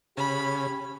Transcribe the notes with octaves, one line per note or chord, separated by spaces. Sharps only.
C#3 G4 B5